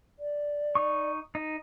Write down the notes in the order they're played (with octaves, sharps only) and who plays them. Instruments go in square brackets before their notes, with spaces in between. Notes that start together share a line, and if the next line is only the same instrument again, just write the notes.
[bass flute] D5
[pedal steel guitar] D#4 C#6
D#4